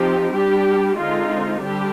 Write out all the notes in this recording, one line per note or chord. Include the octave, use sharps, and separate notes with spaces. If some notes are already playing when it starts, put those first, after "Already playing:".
Already playing: F3 C4 D#4 G4
G3 D4 G4
D3 G#3 C4 D#4 F4
D3 G3 D4 G4